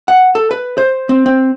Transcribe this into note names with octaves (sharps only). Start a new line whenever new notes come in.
F#5
A4
B4
C5
C4
C4